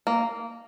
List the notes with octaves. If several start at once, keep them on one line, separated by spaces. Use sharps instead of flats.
A#3